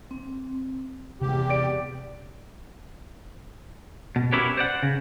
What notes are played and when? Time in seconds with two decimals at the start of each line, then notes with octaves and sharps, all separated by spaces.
0.11 C4
1.21 E2 C3 G#3 G4
1.49 D5 D7
4.16 B2
4.32 C#4 E4 G4 A#4 B4 C#5
4.57 C5 D5 F#5
4.83 C#3